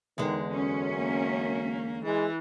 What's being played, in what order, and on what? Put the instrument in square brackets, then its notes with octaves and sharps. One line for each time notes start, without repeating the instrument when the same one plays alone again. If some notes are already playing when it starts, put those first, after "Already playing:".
[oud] E2 D3 G#3 [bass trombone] D#3
[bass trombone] F#2 [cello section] C#4
[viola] A#3
[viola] E3 [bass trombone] G#3